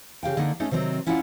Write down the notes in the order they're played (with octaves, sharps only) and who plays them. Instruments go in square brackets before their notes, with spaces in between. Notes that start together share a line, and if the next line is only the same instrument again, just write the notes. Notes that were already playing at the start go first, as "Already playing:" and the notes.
[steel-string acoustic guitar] C#3 G4 F5 G5
D3 A#3 D4 D#4 F#5
A3 C#4 D#4 E4 A4
C3 D#3 F#3 C4
C#4 E4 F4 D5 F5 F#5